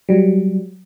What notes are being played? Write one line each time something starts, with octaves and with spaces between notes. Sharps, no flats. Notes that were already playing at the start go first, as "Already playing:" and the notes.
F#3 G3